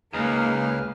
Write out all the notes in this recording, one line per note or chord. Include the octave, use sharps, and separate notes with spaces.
C#2 A#3 D#4 G#4 B4 F5 F6